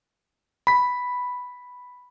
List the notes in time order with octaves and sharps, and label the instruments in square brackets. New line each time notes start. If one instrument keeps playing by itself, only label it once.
[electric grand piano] B5 B6